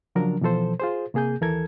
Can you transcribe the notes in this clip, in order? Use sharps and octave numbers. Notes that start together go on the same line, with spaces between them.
C#3 F3 F#3 D4 A#4
B2 E3 F3 A4 C5
F4 G#4 C5
C3 A#3 G#4 G#5 G6
D#2 E3 A4 A#4 G#6